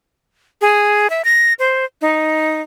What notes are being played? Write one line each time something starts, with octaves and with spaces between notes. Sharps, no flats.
G#4
E5
A#6
C5
D#4